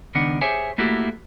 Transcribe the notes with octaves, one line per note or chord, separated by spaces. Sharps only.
C#2 D#3 B3 D4 F#5
G4 G#4 C5 C#5 E5 G#5
A3 A#3 E4 F#4 G4 A4